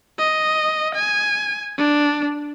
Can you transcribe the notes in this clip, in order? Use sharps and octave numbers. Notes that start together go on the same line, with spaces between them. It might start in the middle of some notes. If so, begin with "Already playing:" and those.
D#5
G#5
D4